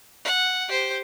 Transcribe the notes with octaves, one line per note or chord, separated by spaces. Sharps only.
F#5
G4 C5